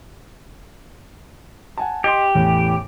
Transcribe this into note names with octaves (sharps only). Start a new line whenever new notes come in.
F#5 G#5 A5
G4 D#5 C6
A1 E2 A2